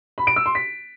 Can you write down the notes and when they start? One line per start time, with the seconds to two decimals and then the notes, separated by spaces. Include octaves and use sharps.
0.18 B5
0.27 D7
0.36 E6
0.46 C6
0.55 B6